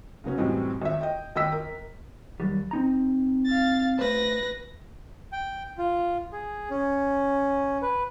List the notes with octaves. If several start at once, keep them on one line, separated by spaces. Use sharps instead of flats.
C#3 F#3 B3 C#4
F#2 A2 E3 G3 G#3 C4
G#1 E5
D#5 G5
G#1 D#5 G5 E6 B6
A#4
D#2 F#3 G3
C4 D#4 A#5
F5 A6
A3 B4 C5 A#6
G5
F4
G#4
C#4
B4